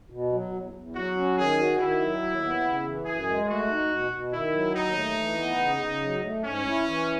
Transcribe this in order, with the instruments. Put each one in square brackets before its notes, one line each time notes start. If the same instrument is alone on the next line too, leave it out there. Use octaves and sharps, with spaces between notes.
[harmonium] B2
F#3
E2
E2
[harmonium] F#3 [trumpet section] F#4
[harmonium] C#4
[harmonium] D#3 [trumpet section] G#4
[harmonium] F#4
[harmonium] D#3 [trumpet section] E4
[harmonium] F#3
D#2
B3
C#3
E3
[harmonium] F#2 [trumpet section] G#4
[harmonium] G#3
[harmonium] A3 [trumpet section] F#4
[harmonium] D#4
B2
B2
[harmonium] D#3 [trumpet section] E4
[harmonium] F#3
[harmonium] D#2 [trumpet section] D#4
[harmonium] A3
E3
B3
C#3
C#3
F#3
A3
[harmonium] G#2 [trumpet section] C#4
[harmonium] E4
E3